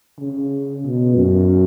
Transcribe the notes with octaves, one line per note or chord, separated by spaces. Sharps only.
C#3
B2
F#2